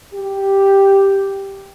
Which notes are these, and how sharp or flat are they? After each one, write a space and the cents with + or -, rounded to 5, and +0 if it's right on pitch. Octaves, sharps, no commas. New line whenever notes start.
G4 +0